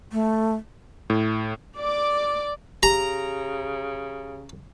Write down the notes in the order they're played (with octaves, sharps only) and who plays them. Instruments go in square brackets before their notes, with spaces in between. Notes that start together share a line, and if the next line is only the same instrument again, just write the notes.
[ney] A3
[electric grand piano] A2
[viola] D5 D6
[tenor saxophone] C#3 [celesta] G4 [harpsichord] A#5